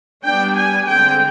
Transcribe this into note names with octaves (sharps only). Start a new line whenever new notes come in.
G3 B3 D4 G5
G#5
D3 G#3 C4 G5